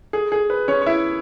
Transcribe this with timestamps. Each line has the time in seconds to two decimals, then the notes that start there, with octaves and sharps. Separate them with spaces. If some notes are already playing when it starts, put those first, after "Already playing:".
0.13 G#4
0.32 G#4
0.50 B4
0.68 C#4 C#5
0.81 C#5
0.86 E4 E5